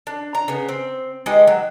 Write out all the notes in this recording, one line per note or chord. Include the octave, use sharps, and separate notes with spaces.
D4
A#5
C#3 B3
C4
G#3 D#4 G4 B4
F#3